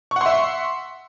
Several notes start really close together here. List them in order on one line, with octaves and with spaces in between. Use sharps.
C#6 F#5 C6 E5